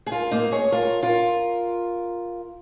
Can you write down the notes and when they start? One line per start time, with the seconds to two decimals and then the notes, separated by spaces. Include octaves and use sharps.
0.06 G#4
0.12 F4 A#4
0.31 A#3 D#4
0.52 G#4 C#5
0.72 F4 A#4
1.03 F4 A#4